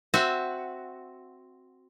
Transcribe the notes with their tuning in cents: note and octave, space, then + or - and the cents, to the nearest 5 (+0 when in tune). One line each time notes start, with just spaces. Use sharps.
C4 +0 F#4 -5 E5 +0